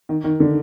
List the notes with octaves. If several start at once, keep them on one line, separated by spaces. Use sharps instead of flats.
D#3
D#3
D3